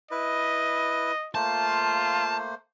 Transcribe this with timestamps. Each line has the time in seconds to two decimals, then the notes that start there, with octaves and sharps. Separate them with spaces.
0.11 E4 B4 D#5
1.35 A3 A#3 F4 C5 A5